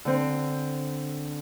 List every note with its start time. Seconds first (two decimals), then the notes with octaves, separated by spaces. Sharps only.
0.05 D3 C4